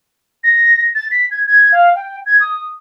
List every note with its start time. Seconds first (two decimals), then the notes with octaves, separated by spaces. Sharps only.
0.44 A#6
0.95 A6
1.11 B6
1.31 G#6
1.46 G#6
1.72 F5
1.95 G5
2.26 G#6
2.40 D#6